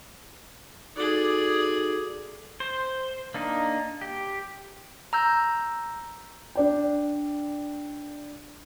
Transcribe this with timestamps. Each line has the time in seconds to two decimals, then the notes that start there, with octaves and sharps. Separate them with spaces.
0.96 D#4 F#4 G#4 A4 D5
2.60 C5
3.34 A#3 D4 D#4
4.01 G4
5.13 A#5 E6 G6
6.55 D4 D5 G5